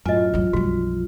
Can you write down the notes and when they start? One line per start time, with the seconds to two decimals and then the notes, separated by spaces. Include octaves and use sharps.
0.06 F#2 A2 F4 D#5 G#5
0.34 F2 F#3
0.53 B1 F#2 F3 G3 F#4